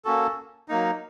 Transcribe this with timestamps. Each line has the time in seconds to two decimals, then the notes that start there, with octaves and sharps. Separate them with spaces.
0.05 A#3 C#4 F#4 A4
0.68 F#3 A#3 D#4